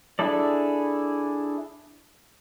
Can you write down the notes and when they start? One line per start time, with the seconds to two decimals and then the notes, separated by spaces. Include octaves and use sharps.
0.19 D4 E4 G#4 A4 D5